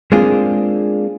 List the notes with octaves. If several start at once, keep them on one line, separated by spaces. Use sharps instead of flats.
G#3 A#3 C4 D4 F4 G#4